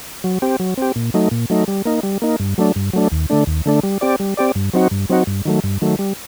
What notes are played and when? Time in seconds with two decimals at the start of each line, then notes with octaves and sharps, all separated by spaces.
0.24 F#3
0.42 C4 G4
0.60 F#3
0.77 C4 G4
0.96 A#2
1.14 F#3 A3 D#4
1.31 A#2
1.50 F#3 A3 D#4
1.68 G3
1.85 A#3 D#4
2.03 G3
2.22 A#3 D#4
2.40 G2
2.58 F#3 A3 D4
2.76 G2
2.93 F#3 A3 D4
3.12 D#2
3.30 D3 A3 D4
3.47 D#2
3.66 D3 A3 D4
3.83 G3
4.01 C4 G4 D5
4.20 G3
4.37 C4 G4 D5
4.55 G2
4.73 F#3 C4 D#4 F#4
4.91 G2
5.10 F#3 C4 D#4 F#4
5.27 G2
5.45 D#3 F#3 A3
5.64 G2
5.82 D#3 F#3 A3
5.99 G3